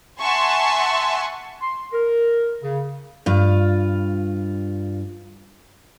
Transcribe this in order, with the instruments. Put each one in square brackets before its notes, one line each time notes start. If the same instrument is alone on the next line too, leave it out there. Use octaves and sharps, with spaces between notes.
[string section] E5 F#5 G#5 A5 C6 C#6
[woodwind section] C6
A#4
C#3
[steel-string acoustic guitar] G2 F4